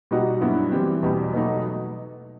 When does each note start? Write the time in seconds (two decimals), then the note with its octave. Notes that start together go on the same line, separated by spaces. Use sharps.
0.11 B2 G3 D#4 F#4
0.41 G2 F#3 B3 E4
0.72 E3 G3 C4
1.03 E2 B2 G3
1.33 B2 F#3 A3 D#4